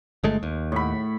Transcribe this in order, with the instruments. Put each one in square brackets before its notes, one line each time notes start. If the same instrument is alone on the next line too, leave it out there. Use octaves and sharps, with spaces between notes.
[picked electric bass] G1 G#3 A3
D#2
[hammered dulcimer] A2 B5